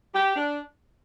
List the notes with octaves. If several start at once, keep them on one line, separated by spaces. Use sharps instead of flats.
G4
D4